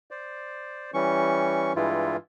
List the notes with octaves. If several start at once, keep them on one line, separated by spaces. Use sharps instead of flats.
C5 D5
E3 G3 C#4 C#6
G2 E3 G3 G#3 E4 F4